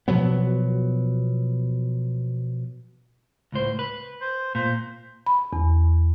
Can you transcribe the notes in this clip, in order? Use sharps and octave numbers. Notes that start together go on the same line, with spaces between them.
B2 F3 F#3 B3
C#2 A2 C5
B4
C5
A#2 C5
B5
E2